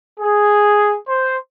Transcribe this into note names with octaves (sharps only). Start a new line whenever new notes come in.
G#4
C5